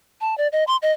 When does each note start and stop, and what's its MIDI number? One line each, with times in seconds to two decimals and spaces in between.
0.21 0.37 81
0.38 0.48 74
0.52 0.64 75
0.67 0.77 84
0.82 0.92 75